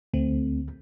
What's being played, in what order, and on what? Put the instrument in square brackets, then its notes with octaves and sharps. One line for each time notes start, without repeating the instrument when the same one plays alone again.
[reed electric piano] D2 [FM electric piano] A3 C4